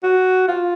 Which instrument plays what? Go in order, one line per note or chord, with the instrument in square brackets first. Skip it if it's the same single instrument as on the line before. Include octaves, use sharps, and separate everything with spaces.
[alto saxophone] F#4
F4